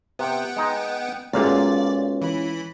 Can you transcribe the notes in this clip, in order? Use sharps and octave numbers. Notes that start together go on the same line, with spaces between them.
C3 B3 F#5 G5
G#3 D#4
B1 A#2 G#3 C#4 F4 D5 F5 A6
E3 B5